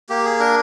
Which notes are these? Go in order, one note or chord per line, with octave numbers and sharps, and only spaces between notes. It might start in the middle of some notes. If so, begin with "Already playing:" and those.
A#3 G4
G#4
D4 A#4